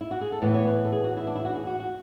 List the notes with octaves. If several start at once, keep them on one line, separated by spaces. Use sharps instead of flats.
E4
F#4
G#4
A4
A2 E3 B3 B4
C#5
B4
A4
G#4
F#4
E4
D4
E4
F#4
G#4
F#4
F#4